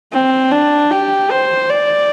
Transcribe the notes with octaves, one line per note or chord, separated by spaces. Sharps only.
C4
D4
G4
C5
D5